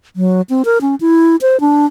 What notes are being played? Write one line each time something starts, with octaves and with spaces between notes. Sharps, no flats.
F#3
C4
A#4
C#4
E4
C5
D4